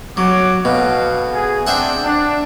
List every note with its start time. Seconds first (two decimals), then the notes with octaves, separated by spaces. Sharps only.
0.17 F#3 F#4 C#5 D6
0.65 B2 F#4 A4 F5
1.34 G#4
1.67 C4 D4 C5 E5 F#5
2.05 D4